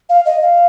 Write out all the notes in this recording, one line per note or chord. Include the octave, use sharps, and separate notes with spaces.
F5
D#5
F5